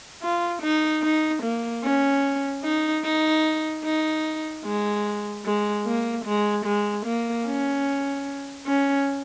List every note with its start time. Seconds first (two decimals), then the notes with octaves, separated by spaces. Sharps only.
0.23 F4
0.63 D#4
1.03 D#4
1.43 A#3
1.84 C#4
2.64 D#4
3.04 D#4
3.84 D#4
4.65 G#3
5.45 G#3
5.86 A#3
6.26 G#3
6.66 G#3
7.06 A#3
7.46 C#4
8.67 C#4